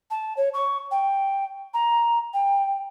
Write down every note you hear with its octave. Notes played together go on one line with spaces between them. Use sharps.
A5
C#5
C#6
G5
A#5
G5